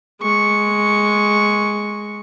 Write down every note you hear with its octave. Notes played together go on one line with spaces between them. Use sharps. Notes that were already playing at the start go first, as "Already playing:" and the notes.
G#3 C#6